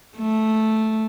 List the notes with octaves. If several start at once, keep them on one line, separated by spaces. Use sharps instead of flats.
A3